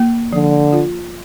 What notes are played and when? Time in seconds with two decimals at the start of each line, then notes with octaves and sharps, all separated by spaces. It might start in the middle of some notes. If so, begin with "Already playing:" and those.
Already playing: A#3
0.33 D3 F3
0.73 F4